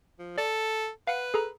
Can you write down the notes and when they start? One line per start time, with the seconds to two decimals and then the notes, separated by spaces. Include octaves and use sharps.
0.19 F3
0.38 A4 D5
1.07 B4 F5 F#5
1.34 G#4 A4 A#5